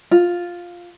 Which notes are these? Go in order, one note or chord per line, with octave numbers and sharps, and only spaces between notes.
F4